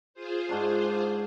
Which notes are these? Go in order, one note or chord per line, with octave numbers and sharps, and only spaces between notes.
F4 G#4 C5
G#2 D4 C#6